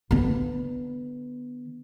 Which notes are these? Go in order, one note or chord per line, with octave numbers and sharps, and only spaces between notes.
D3 B3